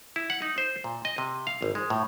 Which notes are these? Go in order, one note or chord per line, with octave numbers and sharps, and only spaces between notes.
E4
F#5
D#4
C5
A#2
D#5
C3
F5
G#1
G#3
A2